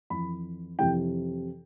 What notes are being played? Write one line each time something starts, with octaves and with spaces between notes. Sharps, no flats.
F2 E3 B5
F2 C3 E3 G5